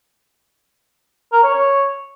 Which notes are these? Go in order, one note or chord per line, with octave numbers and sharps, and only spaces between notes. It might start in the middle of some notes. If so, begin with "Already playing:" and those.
A#4
C#5
C#5